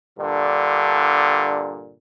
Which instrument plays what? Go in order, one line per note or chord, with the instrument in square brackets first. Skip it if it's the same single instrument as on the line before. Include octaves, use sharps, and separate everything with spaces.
[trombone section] G2 A#2 D3